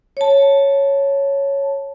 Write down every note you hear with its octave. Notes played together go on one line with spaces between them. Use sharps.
C#5 A5